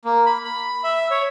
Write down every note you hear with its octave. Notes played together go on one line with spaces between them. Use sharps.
A#3
B5
B5
E5
C#5